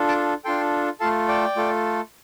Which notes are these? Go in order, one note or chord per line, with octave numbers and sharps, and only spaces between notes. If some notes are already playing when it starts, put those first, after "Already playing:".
Already playing: D4 F4 A4
A5 D6
D4 F4 A4 G5 C6
A3 F4 A4 F5 A5
D5 G5
A3 F4 A4